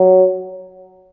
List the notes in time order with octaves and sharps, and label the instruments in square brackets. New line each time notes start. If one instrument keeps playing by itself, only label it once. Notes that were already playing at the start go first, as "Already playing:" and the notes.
Already playing: [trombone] F#3